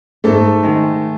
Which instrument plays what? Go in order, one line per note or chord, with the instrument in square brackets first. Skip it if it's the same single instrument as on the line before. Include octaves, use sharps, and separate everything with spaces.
[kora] G#2 [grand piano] A3 A4
[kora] D#3 G#3